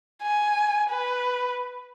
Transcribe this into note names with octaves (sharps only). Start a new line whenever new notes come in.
G#5
B4